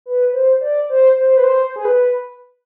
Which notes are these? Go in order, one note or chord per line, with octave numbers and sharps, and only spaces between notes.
B4
C5
D5
C5
C5
B4
C5
G#4
B4